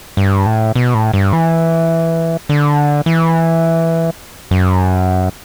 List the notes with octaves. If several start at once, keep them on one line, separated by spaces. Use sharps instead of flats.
G2
A2
B2
A2
G2
E3
D3
E3
F#2